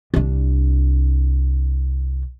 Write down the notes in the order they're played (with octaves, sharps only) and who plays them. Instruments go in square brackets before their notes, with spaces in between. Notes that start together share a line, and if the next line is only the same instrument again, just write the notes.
[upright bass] C2 D4